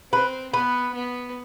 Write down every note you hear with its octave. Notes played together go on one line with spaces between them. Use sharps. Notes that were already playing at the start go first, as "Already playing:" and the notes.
C4 B4
B3 B4
B3